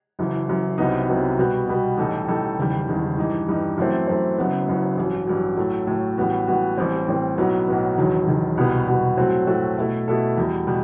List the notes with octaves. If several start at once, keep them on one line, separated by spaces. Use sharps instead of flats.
F#1 F#2 E3
F#1 F#2 E3
C2 C3 F#3 B3 D#4
C2 C3 F#3 B3 D#4
B2 G3 B3 F#4
B2 G3 B3 F#4
A1 A2 G3 D#4 A4
A1 A2 G3 D#4 A4
F#1 E2 D#3 G3
F#1 E2 D#3 G3
G2 E3 G3 D#4
G2 E3 G3 D#4
F#2 E3 A3 C4
F#2 E3 A3 C4
F#1 F#2 F#3 B3
F#1 F#2 F#3 B3
A1 G2 F#3
A1 G2 F#3
A2 F#3 A3
A2 F#3 A3
A1 A2 G3 B3 F#4
A1 A2 G3 B3 F#4
A1 A2 G3 C4
A1 A2 G3 C4
B1 A2 F#3 B3
B1 A2 F#3 B3
E1 E2 D#3 F#3
E1 E2 D#3 F#3
C2 B2 G3 B3 F#4
C2 B2 G3 B3 F#4
A2 F#3 A3 C4 F#4
A2 F#3 A3 C4 F#4
B2 A3 E4 A4
B2 A3 E4 A4
E2 B2 G3
B2 G3